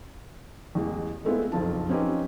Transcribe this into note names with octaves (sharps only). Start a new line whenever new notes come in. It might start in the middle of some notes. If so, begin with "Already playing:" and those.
A1 E2 G#3
G#3 A3 B3 C4 E4 F4
F#1 B1 F2 F4 A5
F3 C4 C#4 D#4 G4 B4